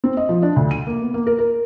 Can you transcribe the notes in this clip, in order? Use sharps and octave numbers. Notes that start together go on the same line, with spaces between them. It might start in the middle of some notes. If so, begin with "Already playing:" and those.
C4
D#5
F3
D4
D2
D#7
A#3
B3
A#3
A#4
A#4